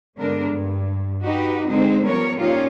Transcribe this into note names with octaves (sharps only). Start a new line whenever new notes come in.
G2 D3 G#3 B3 D4 A#4
G2
D#4 F#4 G4 B4 D#5
D3 G#3 C4 D#4 C5
F3 G3 B3 C#4 A#4 C#5
A#2 C#4 D#4 F4 G4